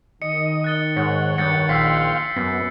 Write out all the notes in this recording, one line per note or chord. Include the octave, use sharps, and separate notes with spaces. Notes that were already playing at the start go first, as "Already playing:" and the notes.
D#3 D#5 C#7
F#6 A6 G7
G#2 D#3 C#5 F#5
G2 G6 A6 C#7
A#1 F5 G5 C6 E6 B6 C7
F#2 B3